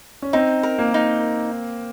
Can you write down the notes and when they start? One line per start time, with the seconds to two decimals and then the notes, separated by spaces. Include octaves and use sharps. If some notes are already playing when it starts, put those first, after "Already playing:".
0.22 C#4
0.33 C4 D#4
0.63 A#4
0.79 A#3
0.94 D#4